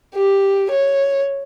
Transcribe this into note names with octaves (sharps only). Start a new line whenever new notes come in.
G4
C#5